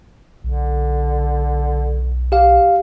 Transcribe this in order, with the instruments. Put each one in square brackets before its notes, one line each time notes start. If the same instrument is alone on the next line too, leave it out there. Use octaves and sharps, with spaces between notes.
[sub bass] B1 [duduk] D3
[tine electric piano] G4 F5